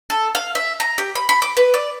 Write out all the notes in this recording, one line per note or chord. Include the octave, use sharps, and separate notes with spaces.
A4
F5
E5
A#5
G4
B5
B5
D6
B4
D5